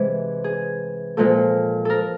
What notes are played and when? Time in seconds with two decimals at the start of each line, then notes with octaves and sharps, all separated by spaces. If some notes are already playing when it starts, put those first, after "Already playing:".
Already playing: C3 E3 G#3 G#4
0.44 G#4
1.17 A#2 F3 G#3 A4
1.85 A4 A#4